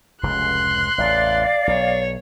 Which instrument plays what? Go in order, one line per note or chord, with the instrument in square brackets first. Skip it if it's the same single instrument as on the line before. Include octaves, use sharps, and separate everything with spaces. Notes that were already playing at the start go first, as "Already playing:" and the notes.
[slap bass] F1 C#2 C#3 [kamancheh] C6 F#6
[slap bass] A1 E2 [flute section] D5 F5
[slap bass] B1 [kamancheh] C#5